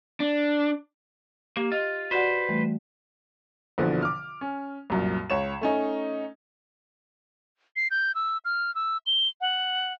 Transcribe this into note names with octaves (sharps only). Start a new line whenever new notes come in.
D4
A#3 G4
F4 D#5
F#4 B4 C5 D5 F#5
E3 G3 A3
A#1 B2 D3 E3 F3
D6 F6
C#4
C2 F#2 A#2
C#2 C#5 E7
A3 C#4 D#4
C7
G6
E6
F6
E6
G7
F#5